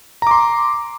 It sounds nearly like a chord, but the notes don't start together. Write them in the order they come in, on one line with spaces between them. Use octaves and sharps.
A#5 D6 C6